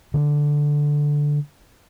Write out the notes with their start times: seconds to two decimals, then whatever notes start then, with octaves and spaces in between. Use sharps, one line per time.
0.14 D3 C4 D4